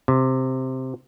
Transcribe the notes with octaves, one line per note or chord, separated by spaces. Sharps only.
C3